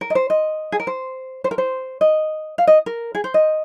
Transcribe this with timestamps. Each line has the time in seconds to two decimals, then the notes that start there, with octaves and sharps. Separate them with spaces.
0.01 A#4
0.10 D#5
0.15 C5
0.30 D#5
0.72 G#4
0.80 A#4
0.87 C5
1.44 C5
1.51 A#4
1.58 C5
2.01 D#5
2.58 F5
2.67 D#5
2.86 A#4
3.15 G#4
3.24 C5
3.34 D#5